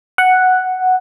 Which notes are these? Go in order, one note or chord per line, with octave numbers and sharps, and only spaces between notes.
F#5